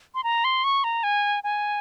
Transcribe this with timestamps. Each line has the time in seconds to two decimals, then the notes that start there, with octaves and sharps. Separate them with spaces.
0.15 C6
0.24 A#5
0.44 C6
0.64 C#6
0.84 A#5
1.03 G#5
1.44 G#5